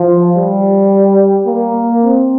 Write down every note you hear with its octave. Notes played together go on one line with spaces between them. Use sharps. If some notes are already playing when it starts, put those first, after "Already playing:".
Already playing: F3
G3
A#3
C4